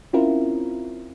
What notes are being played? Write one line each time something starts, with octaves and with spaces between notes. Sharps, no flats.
C4 C#4 E4 F4 A#4